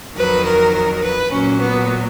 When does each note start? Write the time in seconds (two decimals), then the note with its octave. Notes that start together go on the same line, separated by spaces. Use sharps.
0.15 F2 D#3 F#3 B4
0.44 A#4
0.73 A#4
1.03 B4
1.31 A#2 F#3 C#4
1.60 B3